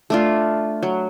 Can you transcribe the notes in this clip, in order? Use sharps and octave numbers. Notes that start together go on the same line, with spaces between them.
A3 D4 F4
F#3